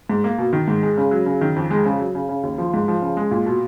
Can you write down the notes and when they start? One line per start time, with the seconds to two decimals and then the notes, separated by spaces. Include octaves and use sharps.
0.10 G#2
0.24 A#3
0.38 B2
0.53 D#3
0.68 G#2
0.83 G#3
0.98 C#3
1.11 F#3
1.26 C#3
1.41 D#3
1.56 F2
1.71 G#3
1.86 C#3
1.99 F#3
2.15 C#3
2.29 C#3
2.43 D#2
2.58 F3
2.74 G#2
2.88 F3
3.02 C#3
3.17 G#3
3.31 A#2
3.46 B2